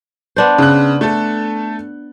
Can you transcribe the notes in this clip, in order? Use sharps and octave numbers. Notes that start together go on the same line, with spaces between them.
B3 D4 C5
C#3 F#6
A3 A4